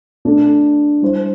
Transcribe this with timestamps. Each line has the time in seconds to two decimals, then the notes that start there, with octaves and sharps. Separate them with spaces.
0.25 A3 D4 A4
1.01 G3 E4 C5